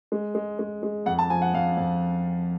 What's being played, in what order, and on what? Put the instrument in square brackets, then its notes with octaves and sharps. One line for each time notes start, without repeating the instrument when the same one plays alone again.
[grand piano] G#3
G#3
G#3
G#3
F2 F#5
A5
F3 G#5
F#5
F2 F5
F2